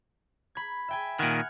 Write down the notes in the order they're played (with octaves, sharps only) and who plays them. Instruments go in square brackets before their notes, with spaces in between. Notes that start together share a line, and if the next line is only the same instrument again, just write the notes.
[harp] B5 G#6
E5 G5 G#5
[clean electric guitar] A#2 D#3 [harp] F#5 F6 G#6